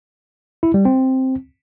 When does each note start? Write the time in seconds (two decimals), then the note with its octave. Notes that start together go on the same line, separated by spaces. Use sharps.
0.63 E4
0.74 G3
0.85 C4